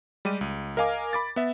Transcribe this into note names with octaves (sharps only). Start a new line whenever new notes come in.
G3 G#3 G4 D#7
C#2
A#4 D#5 F5 G#5 D6
B5 D6 A6
B3 E5